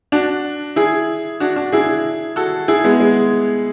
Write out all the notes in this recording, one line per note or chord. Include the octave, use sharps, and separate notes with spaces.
D4 F#4
E4 G#4
D4 F#4
D4 F#4
E4 G#4
F#4 A4
E4 G#4
G#3 B3
G#3